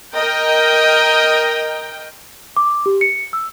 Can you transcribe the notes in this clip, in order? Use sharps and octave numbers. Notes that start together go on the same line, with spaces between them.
A#4 D#5 G5
D6
G4
C#7
E6